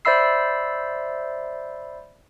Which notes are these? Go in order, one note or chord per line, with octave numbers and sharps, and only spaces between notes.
C5 D5 E5 B5 E6 C7